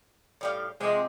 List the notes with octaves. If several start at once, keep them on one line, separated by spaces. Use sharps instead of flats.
A2 G3 F5
C3 F3 G#3 C4